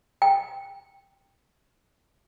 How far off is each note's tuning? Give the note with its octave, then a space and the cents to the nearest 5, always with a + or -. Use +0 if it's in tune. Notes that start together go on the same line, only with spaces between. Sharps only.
G5 +10